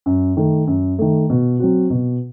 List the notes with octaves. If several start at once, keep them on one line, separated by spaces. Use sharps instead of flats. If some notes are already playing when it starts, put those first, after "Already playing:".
F#2
D#3 A3
F#2
D#3 A3
B2
F#3 C4 F#4
B2